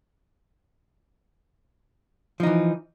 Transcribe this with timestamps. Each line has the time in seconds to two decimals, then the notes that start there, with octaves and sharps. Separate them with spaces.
2.40 F3
2.43 D#4
2.47 E3